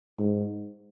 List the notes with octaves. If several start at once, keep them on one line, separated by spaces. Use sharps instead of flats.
G#2